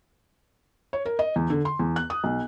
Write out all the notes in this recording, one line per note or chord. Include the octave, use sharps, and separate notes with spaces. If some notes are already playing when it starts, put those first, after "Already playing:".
C#5
A#4
D#5
E2
D3
C6
E2
F#6
D#6
B1